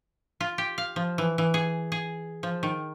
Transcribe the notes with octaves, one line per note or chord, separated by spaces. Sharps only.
F4
G4
F5
F3
E3
E3
G#4
G#4
F3
D#3